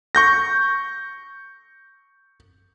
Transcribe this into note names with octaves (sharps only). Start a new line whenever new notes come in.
C#6 G6 A#6